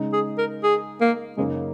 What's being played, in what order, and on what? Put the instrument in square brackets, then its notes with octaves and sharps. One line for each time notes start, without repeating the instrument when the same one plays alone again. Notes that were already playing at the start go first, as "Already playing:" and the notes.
Already playing: [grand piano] C#3 G#3 D#4
[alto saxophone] G#4
A#4
G#4
A#3
[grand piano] F#2 C#3 A#3 D#4 [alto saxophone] G#3